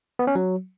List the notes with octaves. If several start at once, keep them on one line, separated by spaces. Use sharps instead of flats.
B3
C#4
F#3